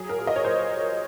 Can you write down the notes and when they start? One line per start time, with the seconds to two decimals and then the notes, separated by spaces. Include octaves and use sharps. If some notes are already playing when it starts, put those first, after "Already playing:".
Already playing: F#3 G#4
0.09 A#4
0.18 A#2
0.27 D#5
0.36 C#5
0.44 A#2 C5